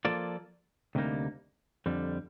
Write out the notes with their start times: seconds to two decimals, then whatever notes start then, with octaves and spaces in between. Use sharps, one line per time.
0.05 F3 A#3 F4 A4 D5
0.95 D2 C3 G3 A#3 D#4
1.86 F2 D3 G3